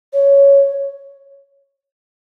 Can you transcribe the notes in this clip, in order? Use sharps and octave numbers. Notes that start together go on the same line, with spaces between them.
C#5